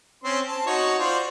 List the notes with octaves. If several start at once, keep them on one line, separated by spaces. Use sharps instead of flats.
C4 C#4 C6
A5
D#4 F#4 C#5
F4 C5 D5